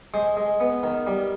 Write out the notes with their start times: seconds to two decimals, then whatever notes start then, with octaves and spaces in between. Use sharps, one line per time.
0.14 G#3 C5
0.37 G#3
0.60 B3
0.83 D#3
1.07 G3